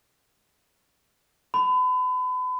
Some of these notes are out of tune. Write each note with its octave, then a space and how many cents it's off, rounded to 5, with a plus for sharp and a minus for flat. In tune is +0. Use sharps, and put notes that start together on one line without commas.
B5 +35